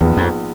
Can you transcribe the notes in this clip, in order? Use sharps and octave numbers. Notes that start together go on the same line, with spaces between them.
A#1 E2 G#2 F3 G#3 B3
F2